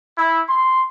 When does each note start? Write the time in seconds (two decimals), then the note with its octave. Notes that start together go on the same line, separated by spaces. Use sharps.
0.18 E4
0.48 C6